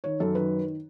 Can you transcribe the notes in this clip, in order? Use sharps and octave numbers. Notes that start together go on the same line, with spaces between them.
D#3 C#5
F#2 A4
D#3 B4